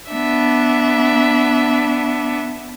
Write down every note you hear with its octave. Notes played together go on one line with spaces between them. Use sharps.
B3 D4 E5